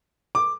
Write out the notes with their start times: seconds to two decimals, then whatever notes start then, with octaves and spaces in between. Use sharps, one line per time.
0.35 D6